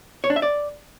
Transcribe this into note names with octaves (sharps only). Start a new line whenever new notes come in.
C#5
D4
E5
D5